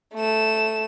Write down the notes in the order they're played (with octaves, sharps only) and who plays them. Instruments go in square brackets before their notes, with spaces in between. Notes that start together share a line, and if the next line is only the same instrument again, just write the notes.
[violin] A3 E7